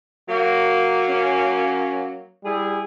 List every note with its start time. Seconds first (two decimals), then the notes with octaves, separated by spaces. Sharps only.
0.29 F#3 A#3
1.09 C#4
2.45 G3 E4 G#4